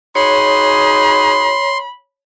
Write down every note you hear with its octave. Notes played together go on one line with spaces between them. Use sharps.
D#4 F#4 G#4 C#5 B5 C6